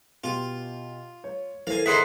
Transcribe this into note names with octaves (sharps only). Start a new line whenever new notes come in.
B2 F4 G4
C#5
E3 A4 A#4 C5 F5 G#5 C7
D#4 E4 G#4 E5 F#5 C6